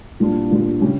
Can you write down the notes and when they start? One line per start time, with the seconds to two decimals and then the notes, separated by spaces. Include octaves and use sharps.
0.20 A#2 G3 D4 F4
0.51 A#2 G3 D4 F4
0.82 C#3 G3 C#4 G4